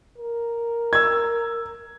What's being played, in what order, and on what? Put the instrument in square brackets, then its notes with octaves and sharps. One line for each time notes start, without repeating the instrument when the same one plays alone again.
[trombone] A#4
[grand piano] E6 G#6